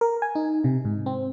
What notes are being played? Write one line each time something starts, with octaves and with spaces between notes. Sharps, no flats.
A#4
G#5
D#4
C3
G#2
C4